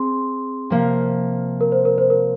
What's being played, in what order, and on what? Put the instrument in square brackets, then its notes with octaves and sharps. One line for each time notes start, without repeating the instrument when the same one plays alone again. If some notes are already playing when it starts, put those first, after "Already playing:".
Already playing: [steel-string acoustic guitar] C4 G#4 [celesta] C6
[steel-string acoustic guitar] C3 F3 A#3
[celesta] A#4
C5
A#4
C5
A#4